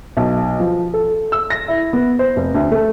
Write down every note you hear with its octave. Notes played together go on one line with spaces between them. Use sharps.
B1
F3
A4
E6
A#6
E4
B3
C5
F1
D2
A3